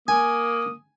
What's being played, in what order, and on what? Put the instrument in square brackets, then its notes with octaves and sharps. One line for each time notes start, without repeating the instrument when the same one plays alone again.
[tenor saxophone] A#3 [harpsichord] G#5 [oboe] D#6